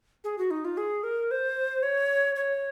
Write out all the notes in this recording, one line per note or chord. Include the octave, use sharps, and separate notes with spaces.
G#4
F#4
D#4
F4
G#4
A#4
C5
C#5
C#5